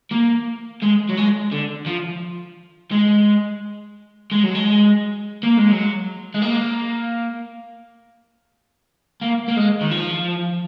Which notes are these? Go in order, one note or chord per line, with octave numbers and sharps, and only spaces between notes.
A#3
G#3
F#3
G#3
D3
F3
G#3
G#3
F#3
G#3
A#3
G#3
F#3
G#3
A#3
A#3
A#3
G#3
D#3
F3